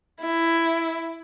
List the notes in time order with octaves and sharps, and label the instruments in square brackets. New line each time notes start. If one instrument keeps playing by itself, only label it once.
[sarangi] E4